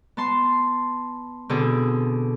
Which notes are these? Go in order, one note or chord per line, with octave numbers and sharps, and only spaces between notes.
B3 A5 C6
B2 D3 B3 C4 G#4 A4